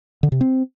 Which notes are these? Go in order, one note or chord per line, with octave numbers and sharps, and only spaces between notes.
D3
C3
C4